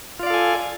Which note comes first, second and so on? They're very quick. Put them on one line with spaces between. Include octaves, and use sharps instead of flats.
F4 D5 F5 A4 G#5